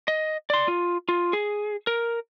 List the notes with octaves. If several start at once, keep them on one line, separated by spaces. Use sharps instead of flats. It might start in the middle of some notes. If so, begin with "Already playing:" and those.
D#5
D5 C6
F4
F4
G#4
A#4